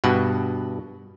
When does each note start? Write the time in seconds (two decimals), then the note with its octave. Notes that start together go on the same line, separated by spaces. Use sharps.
0.04 G2 B2 F#5